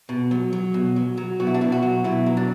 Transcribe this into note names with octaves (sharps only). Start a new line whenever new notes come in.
B2
F#3
F#3
B2
F#3
F#3
B2 F#4
E4
D4
B2 E4
F#4
F#3
B2 E4
F#3
D4